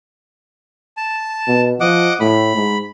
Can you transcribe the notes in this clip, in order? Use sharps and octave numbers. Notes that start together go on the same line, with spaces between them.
A5
B2
F3 D#5 F#5 D6
A2 B5
G#2